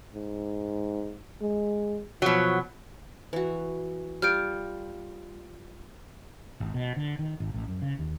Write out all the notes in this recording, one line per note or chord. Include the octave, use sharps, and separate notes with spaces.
G#2
G#3
B2 F3 F#3
E3 F#4
G3 F4 F6 G6 D7
G#1
B2
D3
D#3
G#1
A1
F#2
C#3
D#2